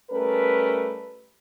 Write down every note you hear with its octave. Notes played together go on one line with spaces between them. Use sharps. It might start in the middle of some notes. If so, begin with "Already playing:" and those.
G3 A3 C#4 A#4 B4